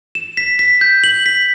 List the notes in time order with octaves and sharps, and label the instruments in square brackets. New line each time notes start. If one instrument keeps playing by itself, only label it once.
[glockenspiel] E7
B6
B6
G6
F#7
B6